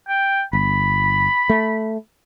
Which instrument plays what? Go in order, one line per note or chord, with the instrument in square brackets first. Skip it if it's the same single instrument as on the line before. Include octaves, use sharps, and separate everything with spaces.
[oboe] G5
[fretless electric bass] G1 [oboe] B5
[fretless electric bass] A3